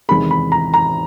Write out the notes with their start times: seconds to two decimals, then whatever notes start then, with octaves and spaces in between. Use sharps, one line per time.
0.09 E2 C3 D#3 G#3 B5
0.31 B5
0.52 A#5
0.74 A#5